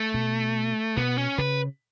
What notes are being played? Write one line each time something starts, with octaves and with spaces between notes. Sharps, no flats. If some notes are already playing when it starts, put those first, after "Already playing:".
Already playing: A3
B2
B2 B3
C#4
C#3 B4